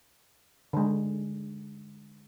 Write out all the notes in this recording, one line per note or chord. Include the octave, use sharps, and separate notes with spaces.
D3 G#3